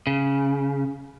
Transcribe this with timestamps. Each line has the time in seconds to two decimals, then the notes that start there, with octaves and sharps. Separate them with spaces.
0.07 C#3